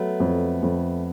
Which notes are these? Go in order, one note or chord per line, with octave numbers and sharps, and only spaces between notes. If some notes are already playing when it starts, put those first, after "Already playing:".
Already playing: F#3 A3 B3
F2
F2